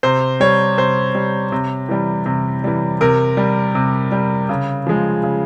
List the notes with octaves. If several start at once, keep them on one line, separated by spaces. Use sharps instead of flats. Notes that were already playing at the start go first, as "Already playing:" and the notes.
C3 C5
G3 C#5
C3 C5
G3
C3
E3 G3
C3
E3 G3
C3 A#4
G3
C3
G3
C#3
F3 G#3
C#3